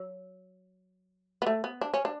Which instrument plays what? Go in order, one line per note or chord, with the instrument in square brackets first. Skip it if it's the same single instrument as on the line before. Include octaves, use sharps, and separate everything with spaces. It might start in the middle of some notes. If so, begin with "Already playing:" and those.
Already playing: [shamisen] F#3
B3
A3
B3
D4
C#4
D4